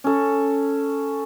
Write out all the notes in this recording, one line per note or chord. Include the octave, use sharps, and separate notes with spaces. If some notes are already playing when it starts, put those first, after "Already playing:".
C#4 A4